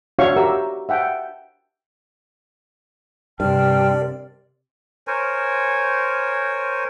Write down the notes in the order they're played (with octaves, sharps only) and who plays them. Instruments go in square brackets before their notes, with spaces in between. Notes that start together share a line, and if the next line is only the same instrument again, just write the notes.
[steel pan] D4 F#4 C#5 E5 F5 C#6
F#4 G4 A#4 E5 A#5 E6
E5 F#5 G5 A5
[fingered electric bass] G2 [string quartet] C3 [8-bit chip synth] A#4 D5 [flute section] G5 A5 F6
[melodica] A#4 C5 C#5 G#5